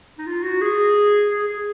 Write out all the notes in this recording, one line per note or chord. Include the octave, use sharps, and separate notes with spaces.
D#4
F4
F#4
G#4
G#4
G#4